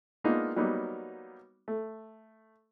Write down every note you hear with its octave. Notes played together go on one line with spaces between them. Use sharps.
G#3 A#3 B3 D4 D#4 F4
F#3 G3 A#3 B3 D#4
A3